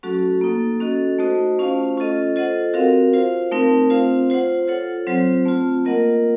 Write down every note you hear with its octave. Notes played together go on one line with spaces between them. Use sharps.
F#3 A3 C#4 F#4 A4
A#3 D#4 A4
C#4 F#4 A4 D#5
A3 D#4 F#4 C5 D#5
A3 C#4 F4 C5 F5
C#4 F4 A4 D#5
F4 A4 C5 D#5 F#5
C4 F#4 A#4 F5
F4 C5 F5
A3 C4 D#4 A#4
C4 F4 C5 F5
F4 C5 F#5
F4 A4 C#5 F#5
F#3 C4 F4 C5
A3 C4 F4
A#3 F4 A#4 D#5 F#5